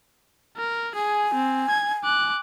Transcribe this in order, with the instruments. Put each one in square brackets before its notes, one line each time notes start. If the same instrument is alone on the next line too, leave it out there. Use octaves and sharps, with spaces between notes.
[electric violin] A#4
[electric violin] G#4 [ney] G#5
[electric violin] C4
G#6
D6 F#6